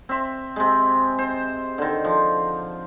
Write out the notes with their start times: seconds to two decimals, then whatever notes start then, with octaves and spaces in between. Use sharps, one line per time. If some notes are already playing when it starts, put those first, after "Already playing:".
0.09 C4 E5
0.56 C3 G#3
1.19 C5
1.78 D3 D#3
2.05 F3